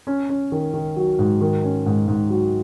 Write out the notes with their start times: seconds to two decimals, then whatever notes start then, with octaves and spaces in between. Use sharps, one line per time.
0.07 C#4
0.29 C#4
0.52 D#3
0.74 D#3
0.96 F#3
1.19 G#2
1.41 D#3
1.64 C#4
1.86 G#2
2.08 G#2
2.30 F#3